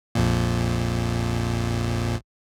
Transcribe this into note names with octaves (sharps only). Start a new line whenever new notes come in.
A#1 F2 A#2